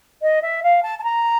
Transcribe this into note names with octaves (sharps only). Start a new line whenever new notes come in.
D#5
E5
F5
A5
A5
A#5